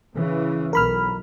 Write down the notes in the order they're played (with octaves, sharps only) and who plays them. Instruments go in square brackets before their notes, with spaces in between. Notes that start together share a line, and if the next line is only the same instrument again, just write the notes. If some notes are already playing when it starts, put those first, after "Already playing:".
[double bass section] C#3 E3
[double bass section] B1 [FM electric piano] A#4 B5 F6